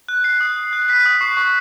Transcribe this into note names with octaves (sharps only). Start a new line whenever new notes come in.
F#6
F#6 C7
D#6
D#6
F#6
F#6 B6
D#6
C#6 C7
C#6